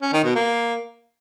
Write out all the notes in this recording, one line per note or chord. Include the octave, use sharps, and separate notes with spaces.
C#4
D#3
B2
A#3